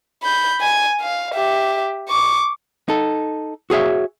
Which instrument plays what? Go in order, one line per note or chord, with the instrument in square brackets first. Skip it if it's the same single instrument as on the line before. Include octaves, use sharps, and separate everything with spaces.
[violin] B5 G6
G#5 G#6
F5
G4 E5
C#6 D6
[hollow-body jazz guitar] D#4 A4
F#4 G#4 C#5 E5